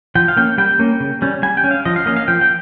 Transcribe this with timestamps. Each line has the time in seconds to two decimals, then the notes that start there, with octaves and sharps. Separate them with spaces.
0.15 F3 G5
0.28 F5
0.37 A#3 C#4 G5
0.58 G3 G5
0.79 A#3 C#4
1.00 C#3
1.22 G3 C#4
1.43 G3 G#5
1.57 G5
1.64 C#4
1.71 F5
1.85 F3 D#5
1.96 F5
2.06 A#3 C#4 D#5
2.16 F5
2.28 F3 G5
2.41 G5